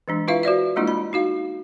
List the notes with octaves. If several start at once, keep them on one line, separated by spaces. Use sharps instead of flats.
E3 G#3 D4
E4 F4 B4 E5 F5
F#4 C5 D5 E5
G3 G#3 A#3 D4 E4 F4
B5
D#4 F#4 F5